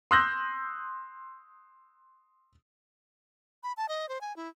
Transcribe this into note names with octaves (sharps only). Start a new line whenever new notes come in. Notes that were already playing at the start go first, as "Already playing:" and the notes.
C6 D#6 E6 F#6 G6 A#6
B5
A5
D#5
C5
G#5
E4